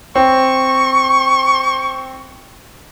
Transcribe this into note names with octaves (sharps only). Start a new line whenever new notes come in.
C4 C#6